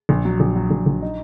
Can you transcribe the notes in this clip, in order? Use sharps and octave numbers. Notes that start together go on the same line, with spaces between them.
A#1
F#3
A#1
F#3
A#1
A#1
D#4